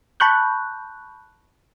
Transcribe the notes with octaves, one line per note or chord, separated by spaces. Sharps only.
A5 B5 C#6 F#6 G6